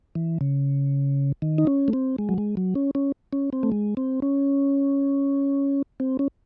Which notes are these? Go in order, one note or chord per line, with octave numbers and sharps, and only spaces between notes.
E3
C#3
D#3
D#4
C#4
A3
C4
G#3
F#3
G#3
F#3
C#4
C#4
C#4
C4
A3
G#3
C4
C#4
C4
C#4